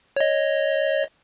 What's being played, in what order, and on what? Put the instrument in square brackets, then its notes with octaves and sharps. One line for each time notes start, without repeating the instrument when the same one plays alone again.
[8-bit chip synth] C#5 D#5